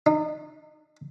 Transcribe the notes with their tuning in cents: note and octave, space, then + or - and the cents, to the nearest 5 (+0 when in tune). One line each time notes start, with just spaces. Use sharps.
D#4 -30